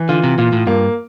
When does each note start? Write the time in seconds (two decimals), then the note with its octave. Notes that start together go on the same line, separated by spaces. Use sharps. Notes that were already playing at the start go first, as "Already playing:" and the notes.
Already playing: E3
0.09 D3 F4
0.24 C3
0.38 A#2 F4
0.53 A2
0.67 G2 A#3